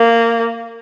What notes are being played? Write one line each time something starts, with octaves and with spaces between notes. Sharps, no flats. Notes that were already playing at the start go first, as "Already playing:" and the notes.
Already playing: A#3